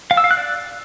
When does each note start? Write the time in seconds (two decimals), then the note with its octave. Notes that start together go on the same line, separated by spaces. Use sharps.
0.11 F5
0.17 E6
0.24 F5
0.31 F#6
0.37 D5